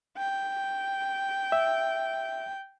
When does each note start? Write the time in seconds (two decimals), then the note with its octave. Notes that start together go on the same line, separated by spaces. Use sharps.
0.18 G5
1.52 E5